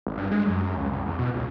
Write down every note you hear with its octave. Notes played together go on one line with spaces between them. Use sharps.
G#1
G2
G#3
F#2
F#2
C#2
C2
E2
B2
C#2